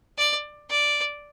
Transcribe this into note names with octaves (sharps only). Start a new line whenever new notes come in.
D5
D5